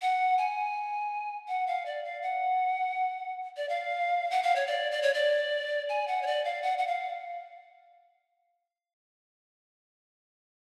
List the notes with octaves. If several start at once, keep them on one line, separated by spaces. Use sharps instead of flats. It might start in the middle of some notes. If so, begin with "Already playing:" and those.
F#5
G#5
F#5
F5
D5
F5
F#5
D5
F5
F#5
F5
C#5
D5
D5
C#5
D5
G#5
F#5
C#5
D5
F5
F#5
F#5
F5